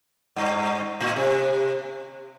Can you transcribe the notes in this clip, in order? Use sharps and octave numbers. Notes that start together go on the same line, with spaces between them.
G2
A2
C3